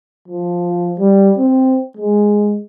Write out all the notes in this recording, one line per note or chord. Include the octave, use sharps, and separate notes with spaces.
F3
G3
C4
G#3